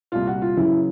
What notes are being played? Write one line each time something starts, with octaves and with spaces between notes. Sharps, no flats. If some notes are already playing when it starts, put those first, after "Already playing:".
C2 A#2 F4
F#4
F4
F#2 C#3 E3 E4